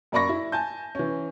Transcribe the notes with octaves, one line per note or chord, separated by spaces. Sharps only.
F#2 A#3 D5 B5 C#6 A#6
E4
G#5 A5 G6
E3 C#4